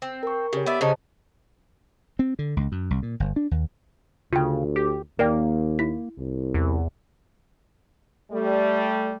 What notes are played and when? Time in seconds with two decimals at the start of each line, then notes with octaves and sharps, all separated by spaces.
0.02 C4
0.23 A#4 C#6
0.53 C#3 G4 C#5
0.66 B3 D5 E5
0.81 C#3 D#4 C5 A5
2.19 C4
2.39 D3
2.57 C#2
2.72 F#2
2.91 C2
3.03 A#2
3.20 G1
3.36 D4
3.51 D#2
4.33 D2 C#3 F4 G5
4.76 G4
5.19 D#2 A#3 A#4 D5 G5
5.79 E4 B6
6.18 C2
6.54 E2
8.32 G3 A3